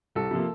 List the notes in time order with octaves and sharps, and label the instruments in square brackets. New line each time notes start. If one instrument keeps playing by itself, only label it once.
[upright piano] C2 [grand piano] A4
[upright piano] C3 F3 A#3